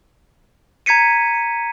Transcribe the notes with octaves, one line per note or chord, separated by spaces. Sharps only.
A#5 G#6 B6 C#7 D#7